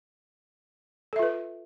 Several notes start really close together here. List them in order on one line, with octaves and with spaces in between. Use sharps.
A4 E5 F4 B4